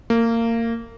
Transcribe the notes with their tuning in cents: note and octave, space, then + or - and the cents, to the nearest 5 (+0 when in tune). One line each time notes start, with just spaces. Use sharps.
A#3 -25